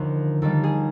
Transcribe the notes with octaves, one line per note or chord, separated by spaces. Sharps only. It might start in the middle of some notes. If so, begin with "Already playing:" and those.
Already playing: D#2 D3 F3 A#4
D#2 D#3 G3 A4
G#4